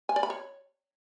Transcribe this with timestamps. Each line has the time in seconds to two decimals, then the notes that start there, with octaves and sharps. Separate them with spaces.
0.09 G#5
0.16 D5
0.23 B5
0.30 C#5